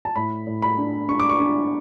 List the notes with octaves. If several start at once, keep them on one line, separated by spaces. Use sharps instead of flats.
A5
A2 B5
A2
B5
D4
D4 C#6
D6
C#6
D4